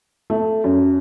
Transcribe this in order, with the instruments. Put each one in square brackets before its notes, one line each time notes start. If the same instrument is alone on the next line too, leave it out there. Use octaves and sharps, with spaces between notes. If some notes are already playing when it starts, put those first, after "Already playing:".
[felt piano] A3
F#2